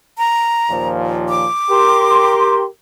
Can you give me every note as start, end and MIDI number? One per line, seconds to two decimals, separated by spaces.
0.18 0.89 82
0.70 1.46 39
0.70 1.46 46
0.70 1.46 53
1.29 2.54 86
1.70 2.66 67
1.70 2.66 70
1.70 2.63 84